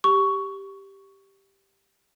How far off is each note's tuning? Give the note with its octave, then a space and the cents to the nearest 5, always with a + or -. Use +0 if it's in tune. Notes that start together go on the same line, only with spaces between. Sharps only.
G4 +0 C#6 +10